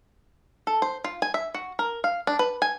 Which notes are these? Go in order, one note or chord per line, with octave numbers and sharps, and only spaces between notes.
A4
C5
F4
G#5
E5
F#4
A#4
F5
D4
B4
G#5